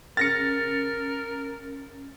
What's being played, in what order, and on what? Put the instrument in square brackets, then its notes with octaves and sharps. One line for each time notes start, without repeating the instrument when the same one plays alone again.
[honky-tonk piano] C#3 F6 [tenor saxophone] A#4 [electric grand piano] A6 A#6 C#7